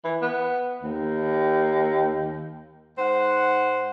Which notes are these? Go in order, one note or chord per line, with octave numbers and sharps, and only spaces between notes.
E3
B3
D#2
G#2 C5 F#5